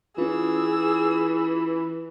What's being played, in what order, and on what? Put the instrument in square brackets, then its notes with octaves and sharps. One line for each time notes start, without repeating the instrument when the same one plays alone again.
[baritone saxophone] E3 [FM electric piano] C#4 F4 [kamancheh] G#4 E6